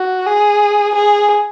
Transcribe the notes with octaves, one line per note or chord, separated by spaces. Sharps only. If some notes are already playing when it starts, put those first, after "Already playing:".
Already playing: F#4
G#4
G#4